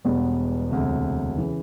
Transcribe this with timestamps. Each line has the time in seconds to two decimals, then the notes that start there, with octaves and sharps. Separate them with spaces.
0.05 E1 E2 B2 G3 B3
0.71 E1 D2 C3
1.37 C#3 E3